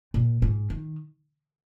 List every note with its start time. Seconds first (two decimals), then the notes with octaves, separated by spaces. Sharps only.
0.14 A#2
0.42 G#2
0.70 D#3